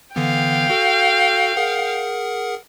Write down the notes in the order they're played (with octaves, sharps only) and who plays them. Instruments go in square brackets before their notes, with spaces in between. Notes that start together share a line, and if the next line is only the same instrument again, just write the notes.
[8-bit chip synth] D3 E3 B3 [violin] F5 G5
[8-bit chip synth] F#4 A4
G#4 A#4 F#5